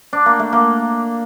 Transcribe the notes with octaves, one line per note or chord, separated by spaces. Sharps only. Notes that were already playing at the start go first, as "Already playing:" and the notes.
D4
A#3
A3
A#3